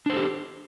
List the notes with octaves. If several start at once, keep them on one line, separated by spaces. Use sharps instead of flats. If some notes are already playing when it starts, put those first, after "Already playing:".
D4 G4 A4 C5